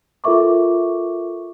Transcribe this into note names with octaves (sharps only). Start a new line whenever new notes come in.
F4 A4 A#4 E5 C#6 D6